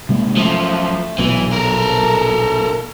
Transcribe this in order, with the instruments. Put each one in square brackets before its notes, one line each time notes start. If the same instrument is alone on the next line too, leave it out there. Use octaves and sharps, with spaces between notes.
[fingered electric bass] C3 G#3 A#3
[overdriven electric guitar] F#2 F3 [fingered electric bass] A3
[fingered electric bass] A#1 B2 F#3 [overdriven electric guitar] E3
[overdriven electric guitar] A4 A#4